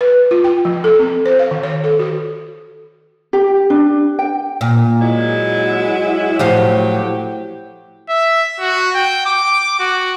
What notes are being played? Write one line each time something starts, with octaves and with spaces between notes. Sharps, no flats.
B4
F4
G5
F3
A4
C4
C5
F5
D#3
C#5
A4
F#4
G4
D4
G5
A#2
F#3 G#3 E4
A2 F3 F#3 G4 F5
E5
F#4
G5
D6
F#4